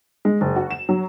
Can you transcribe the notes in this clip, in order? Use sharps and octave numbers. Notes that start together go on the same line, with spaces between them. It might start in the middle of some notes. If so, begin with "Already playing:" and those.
G#3
F#1
F#4
E7
F#3